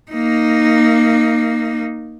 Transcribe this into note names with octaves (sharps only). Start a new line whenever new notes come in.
A#3 D#4